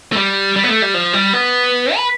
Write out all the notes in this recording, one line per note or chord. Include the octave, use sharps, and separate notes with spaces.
A3
G3
G3
B3
A3
G3
F3
G3
B3
B4